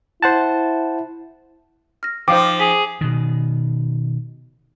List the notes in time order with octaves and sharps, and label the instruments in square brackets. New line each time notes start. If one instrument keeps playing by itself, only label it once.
[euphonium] E4 [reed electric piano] C5 F#5 A5
[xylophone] F6 A#6
[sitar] F3 D#4 [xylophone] C5 F5 G5 [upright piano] D6
[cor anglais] G#4 [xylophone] B6
[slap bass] B2 D#3